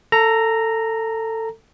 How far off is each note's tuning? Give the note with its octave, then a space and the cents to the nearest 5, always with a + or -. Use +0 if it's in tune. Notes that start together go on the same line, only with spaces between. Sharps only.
A4 +20 A#5 -5